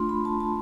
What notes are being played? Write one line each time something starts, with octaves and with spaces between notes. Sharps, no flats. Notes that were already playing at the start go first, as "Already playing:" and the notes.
Already playing: A3 D4 F4 C6
B5
A5
A5